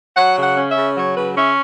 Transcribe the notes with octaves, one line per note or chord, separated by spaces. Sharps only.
F#3 F#5
C#3
F#5
C#4
E5
C#3
F#3 C#5
C#3 B4
C#4 E5